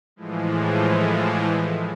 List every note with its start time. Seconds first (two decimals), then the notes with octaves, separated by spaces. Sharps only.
0.16 A2 E3 F3 G#3